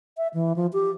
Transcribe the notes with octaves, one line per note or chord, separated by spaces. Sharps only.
E5
E3
F3
G4